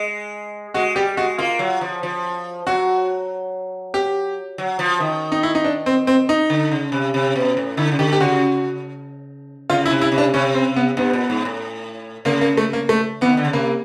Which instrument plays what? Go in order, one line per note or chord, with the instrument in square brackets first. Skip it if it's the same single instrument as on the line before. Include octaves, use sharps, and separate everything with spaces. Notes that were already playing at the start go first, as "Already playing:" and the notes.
Already playing: [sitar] G#3
[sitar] G#3 [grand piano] F#4
[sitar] G3 [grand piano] G4
[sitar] G#3 [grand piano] F#4
[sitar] A#3 [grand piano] F4
[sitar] F#3
F3
F3
[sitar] F#3 [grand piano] F#4
[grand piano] G4
[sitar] F#3
F3
D#3
[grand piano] D#4
E4
D#4
D4
C4
C4
D#4
[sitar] D3
C#3
C3
C3
B2
A2
[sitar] D3 [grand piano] E4
[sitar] C#3
[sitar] D3 [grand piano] G4
[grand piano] G4
[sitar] C#3 [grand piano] F#4
[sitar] C#3 [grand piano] F4
[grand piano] E4
[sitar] C3
[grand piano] E4
[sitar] C3
[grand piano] D4
[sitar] C3 [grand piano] C#4
[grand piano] C4
B3
[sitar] G2 [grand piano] B3
[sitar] A#2
G#2
A2
[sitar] C#3 [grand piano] A#3
[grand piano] A#3
A3
A#3
A3
[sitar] E3 [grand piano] B3
[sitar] D#3
D3
C#3
[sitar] C3 [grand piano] A#3